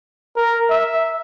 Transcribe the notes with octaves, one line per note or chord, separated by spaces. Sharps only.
A#4
E5